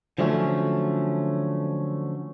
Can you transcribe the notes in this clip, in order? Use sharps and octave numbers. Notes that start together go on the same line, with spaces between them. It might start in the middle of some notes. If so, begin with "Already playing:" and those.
D3 F3 F#3 A3 C4 C#4